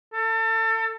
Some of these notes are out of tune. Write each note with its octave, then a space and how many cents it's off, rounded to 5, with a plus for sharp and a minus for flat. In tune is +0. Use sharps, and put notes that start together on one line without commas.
A4 +30